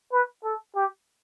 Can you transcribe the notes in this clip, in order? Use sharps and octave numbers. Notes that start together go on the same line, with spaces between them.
B4
A4
G4